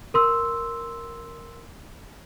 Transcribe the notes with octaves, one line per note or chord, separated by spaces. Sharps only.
A#4 C6 E6